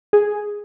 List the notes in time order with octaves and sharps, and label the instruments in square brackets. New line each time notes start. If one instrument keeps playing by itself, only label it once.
[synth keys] G#4